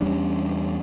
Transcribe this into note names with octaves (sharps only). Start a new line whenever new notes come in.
E2 G3 C#4 D4